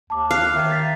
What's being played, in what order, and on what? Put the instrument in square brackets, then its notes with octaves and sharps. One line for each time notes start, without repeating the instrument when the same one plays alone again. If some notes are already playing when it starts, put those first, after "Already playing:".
[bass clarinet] D#2 [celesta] A5 D6
[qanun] F5 [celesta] F#6 C7
[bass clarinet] D#3 [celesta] E5
[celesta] A6 B6